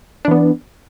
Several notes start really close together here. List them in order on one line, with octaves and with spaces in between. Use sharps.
D4 E3 B3